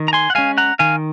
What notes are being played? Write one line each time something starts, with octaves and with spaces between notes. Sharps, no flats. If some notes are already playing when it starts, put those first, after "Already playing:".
Already playing: D#3
A#5
G#5 C6
F#5
G#3 C#4 F5 G#5
F#5 A#5
D#3 F5 G#5